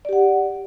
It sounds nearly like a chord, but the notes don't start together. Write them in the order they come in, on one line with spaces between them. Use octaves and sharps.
D5 G4 F#5